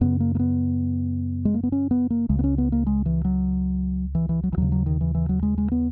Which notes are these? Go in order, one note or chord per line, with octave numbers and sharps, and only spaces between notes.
F#2 C#3 B3
A#3
A#3
B3
G#3
A#3
B3
C#4
B3
A#3
C#2 C#3 G#3
B3
C#4
B3
A#3
G#3
E3
F#3
E3
E3
F#3
E3
D#2 C#3 F#3
F#3
D#3
E3
E3
F#3
G#3
G#3
B3